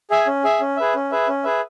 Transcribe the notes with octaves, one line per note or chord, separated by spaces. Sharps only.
G#4 E5 G#5
C#4
G#4 E5 G#5
C#4
G#4 B4 E5
C#4
G#4 B4 E5
C#4
G#4 B4 E5